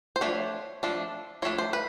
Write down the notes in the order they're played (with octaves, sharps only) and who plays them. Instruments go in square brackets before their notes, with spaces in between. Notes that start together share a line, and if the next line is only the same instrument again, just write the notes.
[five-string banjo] C5
F3 A3 D4 C#5
F3 A3 D4
F3 A3 D4 C#5
C5
B4